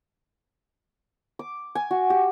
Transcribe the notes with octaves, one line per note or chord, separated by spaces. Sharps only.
D6
G#5
F#4
G4